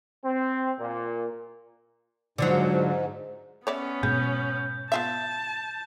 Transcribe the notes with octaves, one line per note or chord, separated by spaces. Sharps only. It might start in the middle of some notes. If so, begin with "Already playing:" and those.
C4
A#2
G#2 D3 F3 F#3
B3 C#4 C#5 D5 E5
G#2 B2 G#4 G6
B3 F4 E5 A5